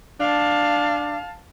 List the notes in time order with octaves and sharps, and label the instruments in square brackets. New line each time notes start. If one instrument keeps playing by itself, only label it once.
[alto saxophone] D4 [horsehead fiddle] F5 A5